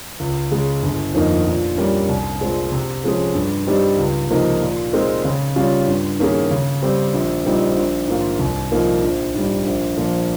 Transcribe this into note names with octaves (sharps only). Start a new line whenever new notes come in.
C#2
C#3 G#3
G1
F2 D#3 A#3 D#4
A#2
G3 A#3 C#4
C2
A#2 G#3 C4
C3
F3 G#3 C#4 G#4
G2
G3 C4 D#4 G4
C#2
C3 F3 A#3 D#4
A#2
G#3 C4 D#4 A#4
C#3
G3 C#4 F4
G2
D#3 A#3 C#4 G#4
C#3
G3 C4 G4
A#1
A#2 G3 C4 D#4
A#1
G#2 D#3 A#3 F4
C2
A#2 F3 A#3 D#4
A#1
G#2 G3
A#1
A#2 F3 A#3